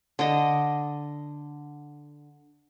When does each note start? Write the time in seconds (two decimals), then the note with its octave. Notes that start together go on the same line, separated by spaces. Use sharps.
0.19 D3 D#5